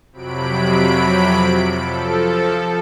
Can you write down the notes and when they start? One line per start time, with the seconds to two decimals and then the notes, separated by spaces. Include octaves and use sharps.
0.12 F2 C3 F#3 B5 D7
1.64 F3 A4